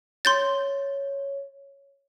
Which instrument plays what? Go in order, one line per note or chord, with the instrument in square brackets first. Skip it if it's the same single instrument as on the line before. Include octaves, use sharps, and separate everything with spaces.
[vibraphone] C#5 [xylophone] C6 G6 A6